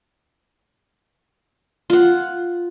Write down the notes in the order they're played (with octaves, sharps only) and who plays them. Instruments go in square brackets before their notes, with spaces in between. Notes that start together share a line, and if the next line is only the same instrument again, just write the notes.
[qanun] F4 F#5